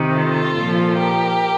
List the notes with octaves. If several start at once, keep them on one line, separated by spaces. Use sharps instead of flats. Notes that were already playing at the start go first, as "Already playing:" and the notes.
Already playing: C3 D#3
F4 A4
A#2 F3
G4 A#4